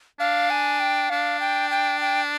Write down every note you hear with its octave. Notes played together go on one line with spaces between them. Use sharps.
D4 F5
G#5
G5
D4 F5
G5
G5
G5